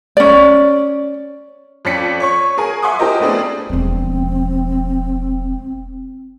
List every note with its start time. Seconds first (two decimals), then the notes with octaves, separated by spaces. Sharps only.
0.17 C#4 D5
1.85 F2 C#4 D5 B6 C#7
2.20 C#5 C#6
2.58 G#4 A#4 G#5
2.82 E5 F#5 G#5 C6 D6 D#6
2.99 E4 G4 A#4 C5 D#5
3.20 A3 B3 C4 D4 G#4
3.70 E1 F3 C4